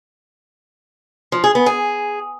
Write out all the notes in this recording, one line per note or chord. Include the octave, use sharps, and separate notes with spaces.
F3
G#4
B3
G#4